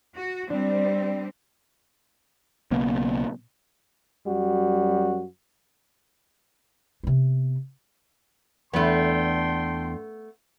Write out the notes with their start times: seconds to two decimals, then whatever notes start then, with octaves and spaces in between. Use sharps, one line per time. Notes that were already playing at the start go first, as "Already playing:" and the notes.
0.16 F#4
0.50 G3 C4 D4
2.71 B1 C#3 A#3 B3
4.26 F#2 G3 F#4
7.03 C3 B3
8.73 E2 A3 B3 D4 A4 G5 C6